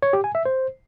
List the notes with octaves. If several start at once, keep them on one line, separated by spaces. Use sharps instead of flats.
C#5
G4
G#5
E5
C5